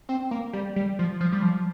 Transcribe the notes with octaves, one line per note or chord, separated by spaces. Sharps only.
C4
A#3
G3
G3
F3
F3
G3
F3